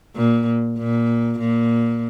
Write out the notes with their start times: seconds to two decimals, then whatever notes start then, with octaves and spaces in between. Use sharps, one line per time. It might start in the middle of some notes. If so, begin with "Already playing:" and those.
0.16 A#2
0.78 A#2
1.39 A#2